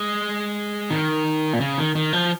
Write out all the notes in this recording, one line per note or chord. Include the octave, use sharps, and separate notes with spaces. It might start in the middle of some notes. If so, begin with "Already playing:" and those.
Already playing: G#3
D#3
A#2
C#3
D#3
D#3
F3